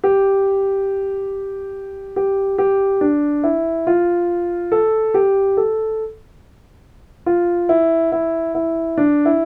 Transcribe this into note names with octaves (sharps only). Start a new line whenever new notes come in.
G4
G4
G4
D4
E4
F4
A4
G4
A4
F4
E4
E4
E4
D4
E4